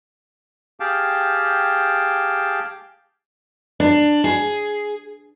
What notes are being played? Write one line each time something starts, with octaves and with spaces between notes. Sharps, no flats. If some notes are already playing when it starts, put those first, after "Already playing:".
G4 G#4 F5 G5 A5
D4
G#4